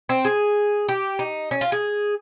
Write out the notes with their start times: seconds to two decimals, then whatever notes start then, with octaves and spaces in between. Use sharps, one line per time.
0.09 C4
0.25 G#4
0.89 G4
1.19 D#4
1.51 C#4
1.61 F4
1.72 G#4